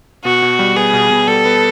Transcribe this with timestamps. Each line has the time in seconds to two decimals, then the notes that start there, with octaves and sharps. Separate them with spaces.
0.24 B2 F#4
0.42 B2
0.59 G3
0.76 B3 G#4
0.93 B2
1.11 B2
1.28 G3 A4
1.46 B3